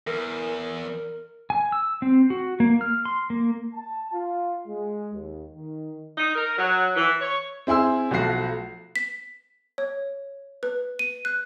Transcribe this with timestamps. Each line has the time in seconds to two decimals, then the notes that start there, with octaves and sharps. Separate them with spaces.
0.07 E2 A#4
1.50 G#5
1.72 E6
2.02 C4
2.30 F#4
2.60 A#3
2.81 F6
3.05 C6
3.30 A#3
3.74 A5
4.12 F4
4.67 G#3
5.13 D#2
5.55 D#3
6.18 D#4
6.36 A#4
6.58 F#3
6.95 E3
7.21 C#5
7.67 C4 E4 G#4 C6 E6
8.11 B1 F3 A3 F#4 C7
8.96 B6
9.78 C#5
10.63 B4
10.99 D#7
11.25 F#6